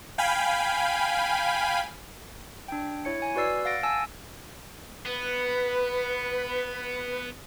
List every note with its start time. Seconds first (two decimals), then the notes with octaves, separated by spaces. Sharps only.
0.18 F5 G5 G#5 B5
2.68 D4 G5
3.05 E4 C#5 C#7
3.22 G#5
3.36 F#4 B4 D5 E6 C7
3.65 F5 F#5 A6 A#6 D7
3.83 G#5 A5 E6
5.06 B3 B4